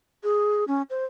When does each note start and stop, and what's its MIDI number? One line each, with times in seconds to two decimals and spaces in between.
0.24 0.64 68
0.68 0.82 61
0.90 1.05 72